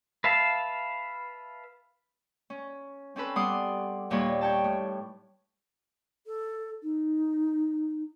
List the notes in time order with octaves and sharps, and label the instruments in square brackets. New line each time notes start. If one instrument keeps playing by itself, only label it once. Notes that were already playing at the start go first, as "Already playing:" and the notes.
[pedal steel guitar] B4 E5 F5 A5
[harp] C#4
C4 C#4 A4 B4
G3 B3 F#5 C6 D6 D#6
D#2 A#2 G3 B4 C#5
C#5 G5 A5
A2
[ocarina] A4
D#4